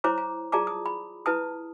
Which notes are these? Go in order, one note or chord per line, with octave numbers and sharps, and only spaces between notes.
E4 C5 C#5 A#5 D6
A#5
F4 G#4 D5 A5 A#5 D6
D#6
B5
E4 B4 A5 D#6